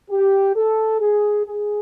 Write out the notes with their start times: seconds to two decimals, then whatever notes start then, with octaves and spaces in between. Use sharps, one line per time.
0.10 G4
0.56 A4
1.01 G#4
1.46 G#4